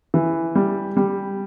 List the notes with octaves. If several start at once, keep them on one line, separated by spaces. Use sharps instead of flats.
E3
G3
G3